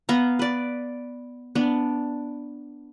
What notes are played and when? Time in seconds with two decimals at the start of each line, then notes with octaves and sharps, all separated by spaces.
0.09 B3 F5 A#5
0.39 B4 D5
1.55 B3 D4